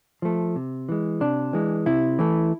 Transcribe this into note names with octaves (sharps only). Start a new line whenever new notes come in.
F3 A3
C3
E3 G#3
C3 D4
E3 G#3
C3 E4
E3 A3